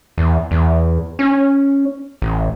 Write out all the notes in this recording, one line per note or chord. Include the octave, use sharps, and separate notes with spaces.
E2
E2
C#4
A1